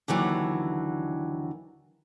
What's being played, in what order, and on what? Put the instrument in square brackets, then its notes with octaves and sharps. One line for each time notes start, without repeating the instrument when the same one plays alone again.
[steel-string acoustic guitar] D#2 D3 E3 F#3